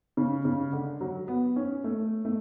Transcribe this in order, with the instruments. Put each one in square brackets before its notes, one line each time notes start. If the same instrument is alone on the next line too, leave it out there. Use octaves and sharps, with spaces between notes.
[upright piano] C#3
C#3
D3
F#3
B3
C#4
A3
A3